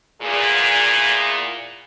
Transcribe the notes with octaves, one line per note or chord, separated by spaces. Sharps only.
E2 A#2 G#4